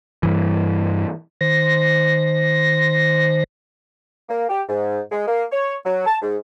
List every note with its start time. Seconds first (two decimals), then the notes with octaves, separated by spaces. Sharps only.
0.23 G2 E3
1.41 D#3 C5 A#6
4.29 A#3
4.49 G4
4.69 G#2
5.11 G#3
5.27 A#3
5.52 C#5
5.85 F#3
6.06 A5
6.22 G#2